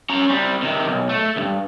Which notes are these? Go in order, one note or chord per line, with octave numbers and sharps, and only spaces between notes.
C#4 A#5
G3 C4
C3 D#3
B1
A3
C#2 G2